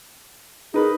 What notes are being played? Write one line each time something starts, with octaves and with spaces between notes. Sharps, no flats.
D#4 G#4 A#4 B4